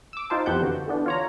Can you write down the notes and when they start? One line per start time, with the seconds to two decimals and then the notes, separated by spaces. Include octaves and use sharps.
0.13 D6 E6
0.30 D#4 F4 C5 A5
0.46 F2 E3 B3 G4 F#5 G6
0.62 D3 F#4
0.87 D3 E3 B3 D4
1.06 F4 C#5 A#5